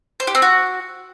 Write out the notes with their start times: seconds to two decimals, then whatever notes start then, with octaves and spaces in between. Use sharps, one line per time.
0.20 C5
0.27 G4
0.35 C4
0.42 F#4